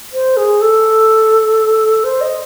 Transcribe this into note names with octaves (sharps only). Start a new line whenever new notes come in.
C5
G#4
A4
C5
D#5